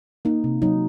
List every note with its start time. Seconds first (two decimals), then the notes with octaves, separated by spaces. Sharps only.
0.25 A#3 D#4
0.44 C3
0.62 F#3 D#4